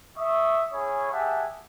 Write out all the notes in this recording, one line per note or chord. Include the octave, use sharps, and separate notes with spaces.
E5 C#6 D#6
C#4 E4 G#4 C#5
G4 G#4 E5 F#5 G#5 A5